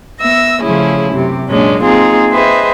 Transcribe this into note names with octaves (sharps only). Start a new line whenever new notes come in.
B3 E5 E6 A#6
C#3 F3 A3 C#4 E4 G#4
F#2 C3 G4
F#2 A#2 G#3 A#3 C#4 D4
A#3 C4 D#4 F4 G#4
G#4 B4 C5 D#5 E5 G5